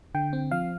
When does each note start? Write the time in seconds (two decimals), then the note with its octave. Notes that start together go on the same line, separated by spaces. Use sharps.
0.15 D3 G5
0.33 C4
0.52 F3 F5